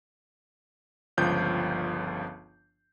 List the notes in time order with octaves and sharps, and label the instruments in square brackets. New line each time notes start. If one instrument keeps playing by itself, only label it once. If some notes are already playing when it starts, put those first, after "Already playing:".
[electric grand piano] G1 C#2 F3 G6